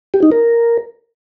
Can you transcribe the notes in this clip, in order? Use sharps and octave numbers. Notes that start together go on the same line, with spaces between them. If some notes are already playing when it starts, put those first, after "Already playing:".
G4
D#4
A#4